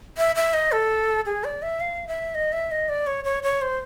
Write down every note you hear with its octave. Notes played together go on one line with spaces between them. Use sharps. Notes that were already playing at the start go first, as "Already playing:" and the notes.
E5
E5
D#5
A4
G#4
D5
E5
F5
E5
D#5
E5
D#5
D5
C#5
C#5
C#5
C5